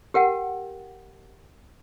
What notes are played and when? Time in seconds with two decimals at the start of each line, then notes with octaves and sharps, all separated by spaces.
0.14 G4 A#4 F#5 G5